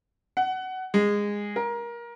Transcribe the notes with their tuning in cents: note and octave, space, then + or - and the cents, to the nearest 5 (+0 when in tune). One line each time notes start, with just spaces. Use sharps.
F#5 +20
G#3 -15
A#4 +20